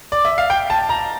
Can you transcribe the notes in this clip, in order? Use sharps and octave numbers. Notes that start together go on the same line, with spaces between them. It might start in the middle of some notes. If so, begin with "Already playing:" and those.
D5
E5
F5
G5
A5
A#5